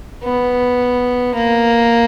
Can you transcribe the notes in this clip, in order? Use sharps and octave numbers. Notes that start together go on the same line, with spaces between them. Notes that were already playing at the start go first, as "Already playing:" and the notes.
B3
A#3